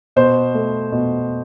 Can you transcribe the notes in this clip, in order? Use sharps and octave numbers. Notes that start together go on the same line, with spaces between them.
B2 C5
A3
B2